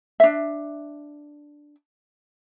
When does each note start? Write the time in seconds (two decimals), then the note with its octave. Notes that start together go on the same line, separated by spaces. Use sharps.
0.20 D4 E5